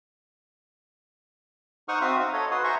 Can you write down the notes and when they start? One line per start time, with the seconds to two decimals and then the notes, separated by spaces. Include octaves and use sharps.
1.88 D#4 C5 F#5 C#6 D#6 F6
2.01 C4 F#4 E5 F5 D#6
2.19 D#4 F5
2.33 A4 C#5 D#5
2.51 F#4 B4 C6 D#6
2.64 C5 E5 G#5 A#5 C6 C#6